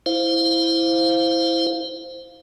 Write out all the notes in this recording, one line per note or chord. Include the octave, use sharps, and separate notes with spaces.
E4 C5 F5